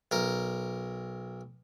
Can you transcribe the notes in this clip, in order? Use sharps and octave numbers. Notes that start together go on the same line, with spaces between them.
B1 A#4